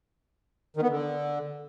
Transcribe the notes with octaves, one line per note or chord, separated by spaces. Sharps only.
D#3
B3
D3